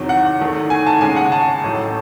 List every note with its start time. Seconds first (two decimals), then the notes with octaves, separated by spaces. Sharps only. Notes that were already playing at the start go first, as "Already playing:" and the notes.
Already playing: E2 C3 D#3 F#3
0.09 F#5
0.40 E2 D#3 A3
0.70 G#5
0.87 A5
1.01 D#2 C#3 G#3 G#5
1.16 F#5
1.32 A5
1.64 A1 A2 F#3 A3